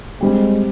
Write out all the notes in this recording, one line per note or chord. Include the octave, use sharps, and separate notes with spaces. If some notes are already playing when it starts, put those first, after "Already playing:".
G3 G#3 C4 G4